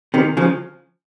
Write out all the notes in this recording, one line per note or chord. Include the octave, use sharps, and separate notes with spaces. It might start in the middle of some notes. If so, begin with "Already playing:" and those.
C3 D#3
C#3 F3